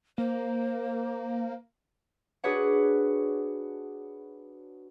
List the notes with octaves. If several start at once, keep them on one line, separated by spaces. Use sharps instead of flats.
A#3 C5
D4 F#4 G#4 B4 C#5 F#5